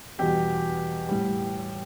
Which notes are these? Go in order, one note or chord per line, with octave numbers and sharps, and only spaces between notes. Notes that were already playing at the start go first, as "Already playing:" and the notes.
E2 B2 G3 G4
A2 G3